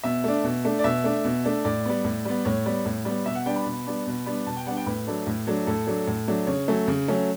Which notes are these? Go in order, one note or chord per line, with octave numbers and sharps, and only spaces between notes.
B2 E5
A3 D4
B2
A3 D4
D5
B2 E5
A3 D4
B2
A3 D4
A2 D5
G3 B3
A2
G3 B3
A2 C#5
G3 B3
A2
G3 B3
B2 E5
F#5
G3 B3 D4 G5
B5
B2
G3 B3 D4
B2
G3 B3 D4
B2 A5
G5
G3 B3 D4 F#5
G5
A2 B4
F#3 A3 D4
A2
F#3 A3 D4
A2 A4
F#3 A3 D4
A2
F#3 A3 D4
C#3 C#5
F#3 A3 C#4
C#3
F#3 A3 C#4